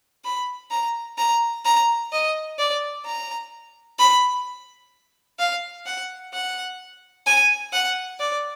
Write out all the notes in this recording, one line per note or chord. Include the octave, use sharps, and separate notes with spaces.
B5
A#5
A#5
A#5
D#5
D5
A#5
B5
F5
F#5
F#5
G#5
F#5
D5